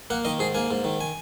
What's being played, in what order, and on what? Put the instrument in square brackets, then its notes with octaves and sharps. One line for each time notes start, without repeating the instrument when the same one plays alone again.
[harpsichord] A#3 F#5
D#3 D#5
G#2 G#4
A#3 G#5
G#2
D#3
G#5